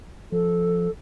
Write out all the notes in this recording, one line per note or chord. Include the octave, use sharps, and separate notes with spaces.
F3 A4